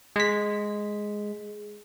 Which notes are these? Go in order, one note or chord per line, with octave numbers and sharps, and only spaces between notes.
G#3 G#4 B6